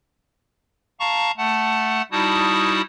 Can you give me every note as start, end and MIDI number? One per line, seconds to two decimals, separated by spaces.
1.00 1.31 77
1.00 1.31 81
1.00 1.31 82
1.00 1.31 85
1.37 2.02 57
1.37 2.02 78
1.37 2.02 81
2.12 2.81 55
2.12 2.81 63
2.12 2.81 64
2.12 2.81 66
2.12 2.81 81
2.12 2.81 87